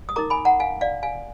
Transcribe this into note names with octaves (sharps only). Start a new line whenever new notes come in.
D#6
D#4 A#4 A#5 D6
G#5 B5
F#5 A#5
F5 G#5
D5 F5
F5 G#5